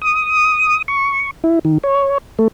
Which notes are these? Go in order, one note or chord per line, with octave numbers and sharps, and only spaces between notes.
D#6
C#6
E4
D#3
C#5
A3